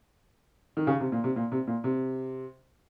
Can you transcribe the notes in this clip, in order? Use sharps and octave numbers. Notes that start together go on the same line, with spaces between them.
D#3
C#3
C3
A#2
C3
A#2
C3
A#2
C3